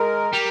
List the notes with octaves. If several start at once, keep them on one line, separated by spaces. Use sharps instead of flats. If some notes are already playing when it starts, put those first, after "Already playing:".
Already playing: G#3 A#4
G3 G4